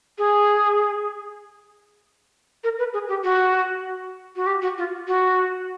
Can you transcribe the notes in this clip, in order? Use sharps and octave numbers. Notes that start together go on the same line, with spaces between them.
G#4
A#4
B4
G#4
G4
F#4
F#4
G4
F#4
F4
F#4